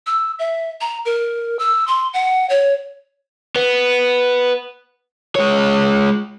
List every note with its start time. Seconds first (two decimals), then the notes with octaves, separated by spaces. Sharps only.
0.07 E6
0.39 E5
0.81 A#5
1.05 A#4
1.59 E6
1.88 C6
2.14 F#5
2.50 C#5
3.56 B3
5.35 G#3 C#5